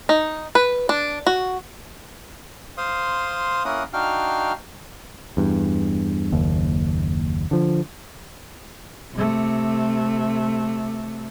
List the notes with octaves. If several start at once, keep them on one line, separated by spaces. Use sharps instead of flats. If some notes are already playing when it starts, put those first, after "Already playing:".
D#4
B4
D4
F#4
C5 F5 C6 D#6
A#3 C#4 E4 A#4 F#5 D#6
D4 D#4 F#4 F5 G5 F6
E2 G2
F#1 D#2
D3 F3
C3 A3